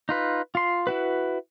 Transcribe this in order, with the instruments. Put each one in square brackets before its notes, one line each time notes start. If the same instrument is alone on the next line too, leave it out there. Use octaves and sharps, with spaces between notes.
[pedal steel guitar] D#4 F4 B4
F4 C6
E4 F#4 B4